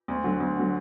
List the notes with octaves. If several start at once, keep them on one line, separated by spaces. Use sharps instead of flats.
D2
D3 F#3
D2
D3 F#3